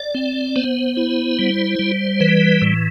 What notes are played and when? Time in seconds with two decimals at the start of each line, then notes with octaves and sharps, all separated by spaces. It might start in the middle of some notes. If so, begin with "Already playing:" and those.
Already playing: D5
0.15 C4
0.56 B3 C5
0.97 E4
1.39 G3
1.79 G3
2.20 E3 B4
2.62 A2